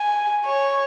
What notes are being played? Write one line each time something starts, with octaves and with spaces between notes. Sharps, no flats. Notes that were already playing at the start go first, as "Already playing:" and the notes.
Already playing: G#5
C#5